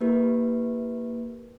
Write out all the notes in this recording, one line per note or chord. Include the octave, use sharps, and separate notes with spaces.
A#3 E4 G4 A#4 B4